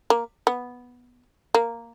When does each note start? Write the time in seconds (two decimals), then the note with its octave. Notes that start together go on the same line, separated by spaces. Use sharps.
0.10 A#3
0.47 B3
1.55 A#3